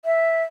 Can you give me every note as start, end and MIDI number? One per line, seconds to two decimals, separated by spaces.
0.05 0.43 76